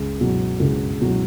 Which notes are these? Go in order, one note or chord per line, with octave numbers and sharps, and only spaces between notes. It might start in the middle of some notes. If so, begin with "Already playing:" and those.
Already playing: C#2
B2 F#3
C#2
B2 F#3